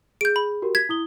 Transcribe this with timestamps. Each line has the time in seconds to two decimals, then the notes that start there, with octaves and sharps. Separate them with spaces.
0.21 G#4 G6 D7
0.36 B5
0.62 F#4 G4 A#4
0.75 G#6 B6
0.89 E4 D#6 G7